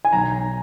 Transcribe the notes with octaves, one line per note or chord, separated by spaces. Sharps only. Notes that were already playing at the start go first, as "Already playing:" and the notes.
G#5
B1 A#5